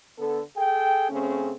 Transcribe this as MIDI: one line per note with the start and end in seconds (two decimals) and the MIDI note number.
0.18 0.41 50
0.18 0.41 59
0.18 0.41 69
0.56 1.09 68
0.56 1.09 69
0.56 1.09 79
1.10 1.52 49
1.10 1.52 57
1.10 1.52 60
1.10 1.52 61
1.10 1.52 68